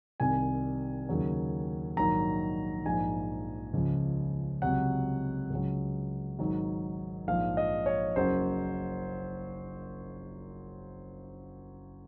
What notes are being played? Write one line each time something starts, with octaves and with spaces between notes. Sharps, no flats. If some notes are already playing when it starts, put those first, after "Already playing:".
C2 C3 D#3 G#5
D#2 C#3 F#3
A#1 G#2 D#3 F#3 A#5
A#1 G#2 F3 G#5
C#2 C#3 F3
C#2 C3 F#3 F#5
C#2 C#3 F#3
G#1 G#2 F#3
A#1 G#2 F3 F5
D#5
C#5
F#1 F#2 C#3 F#3 C5